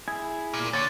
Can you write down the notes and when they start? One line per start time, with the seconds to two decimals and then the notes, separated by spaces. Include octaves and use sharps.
0.08 E4 G#4 G#5
0.54 A#2
0.73 D3 C#5 A6